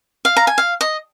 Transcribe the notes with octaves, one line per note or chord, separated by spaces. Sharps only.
F5
A#5
G#5
F5
D#5